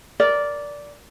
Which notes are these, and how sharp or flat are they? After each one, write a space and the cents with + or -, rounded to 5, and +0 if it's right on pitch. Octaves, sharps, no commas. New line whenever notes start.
A#4 +0 D5 -10